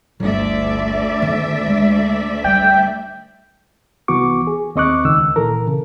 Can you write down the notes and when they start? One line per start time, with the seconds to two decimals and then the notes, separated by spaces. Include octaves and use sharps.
0.20 G1 D2 D5 E5
1.22 D#3 B3
1.67 G#3
2.44 G3 G5
4.08 C2 E3 B3 F#4 C#6 D6
4.47 G#4
4.75 D#2 C4 D#5 C#6 D6 F#6
5.05 C#2 D#3 E6
5.36 A#2 E3 A4 A#4
5.67 C#3